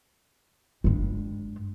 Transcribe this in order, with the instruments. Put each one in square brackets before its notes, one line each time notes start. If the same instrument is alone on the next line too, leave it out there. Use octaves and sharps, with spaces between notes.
[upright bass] G2 G#3